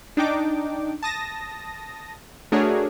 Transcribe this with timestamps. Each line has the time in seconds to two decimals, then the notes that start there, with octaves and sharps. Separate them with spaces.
0.17 D4 D#4 G5 D6
1.03 A5 D#6 A#6
2.52 A3 D4 F#4 G#4 A#4 C#5